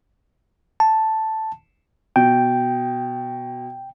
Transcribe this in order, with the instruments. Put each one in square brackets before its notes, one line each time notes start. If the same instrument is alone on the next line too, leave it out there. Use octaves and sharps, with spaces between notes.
[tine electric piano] A5
[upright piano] B2 [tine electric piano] G5